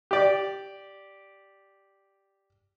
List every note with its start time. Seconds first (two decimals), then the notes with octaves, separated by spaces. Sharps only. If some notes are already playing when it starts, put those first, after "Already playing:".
0.11 G4 D5